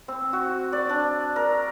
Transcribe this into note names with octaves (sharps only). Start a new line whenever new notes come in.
C4
F#4
D5
D4
A#4